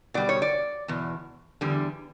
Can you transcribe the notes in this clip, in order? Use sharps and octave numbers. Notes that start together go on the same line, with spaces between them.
B2 G3 D5
C#5
D5
E2 B2
E2 D3 G3